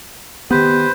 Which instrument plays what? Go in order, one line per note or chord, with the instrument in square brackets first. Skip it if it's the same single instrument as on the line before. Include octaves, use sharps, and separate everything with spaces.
[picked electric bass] D#3 B3 [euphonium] G4 [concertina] B4 C5